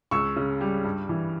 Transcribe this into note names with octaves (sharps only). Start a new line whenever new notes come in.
C#2 C#6 E6
C#3
G3
G2
E3